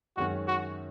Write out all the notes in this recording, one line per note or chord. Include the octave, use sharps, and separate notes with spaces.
F#2 D#3 G#3 C#4 F#4
F#4